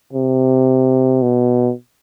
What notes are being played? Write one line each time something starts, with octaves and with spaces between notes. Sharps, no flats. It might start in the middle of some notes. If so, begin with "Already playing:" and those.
C3
B2